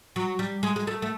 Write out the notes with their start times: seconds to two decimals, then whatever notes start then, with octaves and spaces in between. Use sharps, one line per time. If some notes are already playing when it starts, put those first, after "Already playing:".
0.16 F#3
0.39 G3
0.63 G#3
0.76 G#3
0.87 A3
1.02 A3